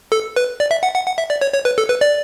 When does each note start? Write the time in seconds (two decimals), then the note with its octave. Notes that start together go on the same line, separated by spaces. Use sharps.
0.12 A4
0.36 B4
0.60 D5
0.71 E5
0.83 F#5
0.94 F#5
1.06 F#5
1.18 E5
1.30 D5
1.41 C#5
1.54 C#5
1.65 B4
1.78 A4
1.89 B4
2.01 D5